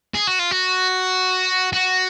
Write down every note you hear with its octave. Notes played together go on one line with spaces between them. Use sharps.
G#4
F#4
F4
F#4
F#4